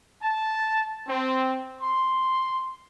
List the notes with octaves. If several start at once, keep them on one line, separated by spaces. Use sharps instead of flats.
A5
C4
C6